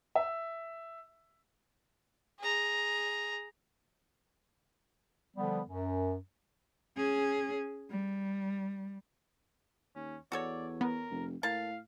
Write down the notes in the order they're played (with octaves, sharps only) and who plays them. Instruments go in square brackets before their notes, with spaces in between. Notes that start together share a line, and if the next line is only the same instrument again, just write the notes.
[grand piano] E5
[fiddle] G#4 A#5
[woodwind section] D3 F3 G3 B3
F#2
[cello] C#4 G#4
G3
[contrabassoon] D#2 [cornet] C#4
[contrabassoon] E2 [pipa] F#4 A4 C#5 [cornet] D5
[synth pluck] B3 [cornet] A#4
[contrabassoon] F1
[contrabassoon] A2 [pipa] A#3 A5 [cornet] F5